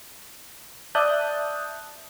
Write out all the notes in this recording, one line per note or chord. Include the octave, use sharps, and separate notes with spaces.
D5 E5 A5 D#6 F#6 G6